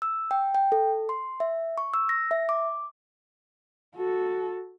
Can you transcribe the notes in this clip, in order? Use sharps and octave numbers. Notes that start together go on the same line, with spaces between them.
E6
G5
G5
A4
C6
E5
C#6
E6
A#6
E5
D6
F#4 A4